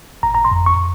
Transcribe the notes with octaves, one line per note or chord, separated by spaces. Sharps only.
G1 A#5
A#5
C6
F2
C#6